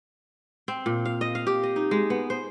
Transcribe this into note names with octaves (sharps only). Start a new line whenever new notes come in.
C4
A#2
F5
D#5
F5
G4
D#5
D#4
G#3
B3
C5